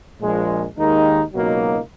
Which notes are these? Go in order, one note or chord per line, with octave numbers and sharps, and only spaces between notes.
A#1 A#2 F3 G#3
D#2 D#3 G#3 D#4
C#2 B2 F#3 A#3 D#4